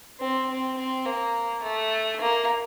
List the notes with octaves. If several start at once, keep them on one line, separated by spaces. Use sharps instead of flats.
C4
C4
C4
A#3
A3
A#3